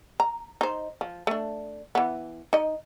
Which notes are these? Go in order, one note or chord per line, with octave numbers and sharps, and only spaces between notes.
A#5
D#4 C5
F3
A3 D4
E3 B3
D#4 D#5